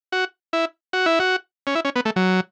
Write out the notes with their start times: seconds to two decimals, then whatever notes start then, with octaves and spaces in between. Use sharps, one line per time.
0.12 F#4
0.53 E4
0.93 F#4
1.06 E4
1.20 F#4
1.67 C#4
1.75 E4
1.85 C#4
1.96 B3
2.05 A3
2.16 F#3